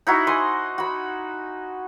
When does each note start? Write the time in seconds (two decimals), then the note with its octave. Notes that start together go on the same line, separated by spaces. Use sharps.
0.07 D#4 E4 F#4
0.27 D#5 G#5 C6
0.78 F#4 B5